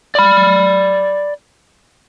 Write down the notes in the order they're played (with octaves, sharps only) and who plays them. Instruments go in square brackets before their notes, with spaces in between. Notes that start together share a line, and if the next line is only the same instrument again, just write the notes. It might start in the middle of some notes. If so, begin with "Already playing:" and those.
[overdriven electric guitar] D5 B5